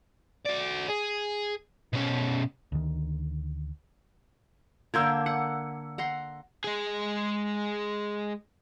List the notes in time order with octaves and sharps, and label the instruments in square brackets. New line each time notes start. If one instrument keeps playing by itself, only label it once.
[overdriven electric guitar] F#4 D5
G#4
B2 C#4
[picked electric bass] D2 D#3
[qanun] D3 A#3 A#4 [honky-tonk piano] E6 G6 G#6
[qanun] F#5 [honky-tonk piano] C#7
[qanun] F#5 A#5 C6
[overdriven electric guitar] G#3 G#4